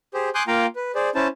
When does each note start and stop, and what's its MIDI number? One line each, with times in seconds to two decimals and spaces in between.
0.14 0.29 67
0.14 0.29 68
0.14 0.29 72
0.35 0.43 80
0.35 0.43 84
0.35 0.43 86
0.35 0.43 87
0.35 0.43 90
0.35 0.43 91
0.47 0.66 58
0.47 0.66 65
0.47 0.66 77
0.47 0.66 79
0.47 0.66 82
0.76 0.92 71
0.95 1.10 68
0.95 1.10 72
0.95 1.10 74
1.15 1.27 61
1.15 1.27 64
1.15 1.27 72
1.15 1.27 81